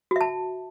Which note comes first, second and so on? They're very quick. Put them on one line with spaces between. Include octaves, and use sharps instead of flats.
F#4 E5 A5